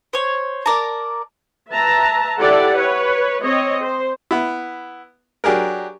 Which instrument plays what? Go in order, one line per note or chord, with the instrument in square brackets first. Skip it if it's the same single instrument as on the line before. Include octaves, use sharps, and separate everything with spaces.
[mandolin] C5 C#5
A#4 D5 A5 A#5
[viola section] B4 E5 A5 A#5
E4 G4 A4 D5 F#5
B4 C#5
C4 C#5 D#5
C5
[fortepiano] B3 E4
F#3 D4 G4 G#4 A#4